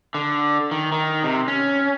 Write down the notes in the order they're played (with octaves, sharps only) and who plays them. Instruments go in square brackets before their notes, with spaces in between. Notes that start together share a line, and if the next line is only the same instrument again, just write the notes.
[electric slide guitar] D3
D#3
D#3
C3
C#4